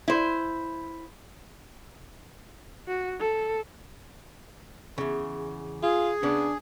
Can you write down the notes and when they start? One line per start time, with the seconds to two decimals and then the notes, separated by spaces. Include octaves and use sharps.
0.08 E4 C5
2.88 F#4
3.20 A4
4.98 E2 C#3
5.83 F4 G#4
6.23 C#3 B3 D4